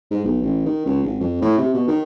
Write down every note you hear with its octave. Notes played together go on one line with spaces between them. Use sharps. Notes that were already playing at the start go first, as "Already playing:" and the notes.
G#2
B1
A1
D#3
C#2
G#1
F2
A2
C3
B2
D#3